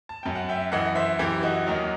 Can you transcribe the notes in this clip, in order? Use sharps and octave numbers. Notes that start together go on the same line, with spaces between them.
A5
F#2 F#3 G5
F#5
E5 G5
F#2 E3 D#5 F#5
C5 E5
F#2 E3 E4 G4
D#4 F#4
D#2 D#3 F#3